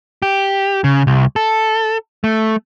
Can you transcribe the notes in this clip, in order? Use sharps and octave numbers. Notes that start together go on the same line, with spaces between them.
G4
C#3
C2
A4
A3